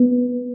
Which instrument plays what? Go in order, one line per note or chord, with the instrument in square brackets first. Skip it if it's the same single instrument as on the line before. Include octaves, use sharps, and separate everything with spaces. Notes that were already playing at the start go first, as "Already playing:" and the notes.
Already playing: [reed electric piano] B3